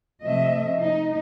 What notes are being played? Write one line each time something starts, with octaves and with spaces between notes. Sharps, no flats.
C3 F3 A3 D#5 E5
D#4